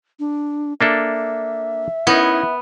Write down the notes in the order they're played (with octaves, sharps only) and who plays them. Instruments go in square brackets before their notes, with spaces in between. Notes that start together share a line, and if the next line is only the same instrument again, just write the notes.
[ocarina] D4
[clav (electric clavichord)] A#3 D4 A4 [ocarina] E5
[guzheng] B3 [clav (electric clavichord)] C#4 D#4 [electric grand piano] E4